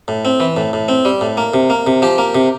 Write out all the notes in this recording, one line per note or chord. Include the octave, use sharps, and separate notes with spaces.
A2
C4
E3
A2
A2
C4
G3
A2
A#3
C3
A#3
C3
F3 G4
A#3
C3